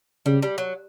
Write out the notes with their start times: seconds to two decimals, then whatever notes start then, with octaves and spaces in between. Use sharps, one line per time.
0.26 C#3 G3
0.42 G3
0.58 F#3